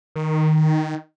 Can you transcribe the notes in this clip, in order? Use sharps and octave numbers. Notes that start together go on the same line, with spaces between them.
D#3